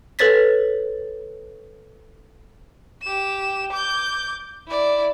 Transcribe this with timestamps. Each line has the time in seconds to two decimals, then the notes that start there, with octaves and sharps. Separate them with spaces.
0.19 A4 B4 C#5 A6 B6
3.02 G4 E7
3.72 D6 G6
4.67 E4 D5